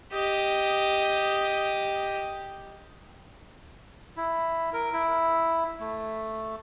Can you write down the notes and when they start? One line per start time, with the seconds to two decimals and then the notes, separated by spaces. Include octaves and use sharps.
0.12 G4 D#5
4.17 E4
4.73 A#4
4.93 E4
5.80 A3